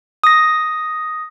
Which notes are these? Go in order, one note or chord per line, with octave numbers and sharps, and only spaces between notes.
D#6 A#6